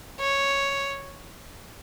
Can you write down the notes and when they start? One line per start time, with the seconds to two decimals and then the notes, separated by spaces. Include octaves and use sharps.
0.20 C#5